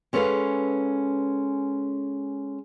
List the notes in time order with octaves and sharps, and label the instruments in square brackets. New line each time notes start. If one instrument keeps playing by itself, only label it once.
[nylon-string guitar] G#3 C#4 A4 B4 F5